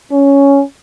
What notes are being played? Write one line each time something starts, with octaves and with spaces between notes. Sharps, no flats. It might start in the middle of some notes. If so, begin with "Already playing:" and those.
C#4